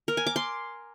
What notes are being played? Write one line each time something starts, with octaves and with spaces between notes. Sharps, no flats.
A#4
G#5
D6
C6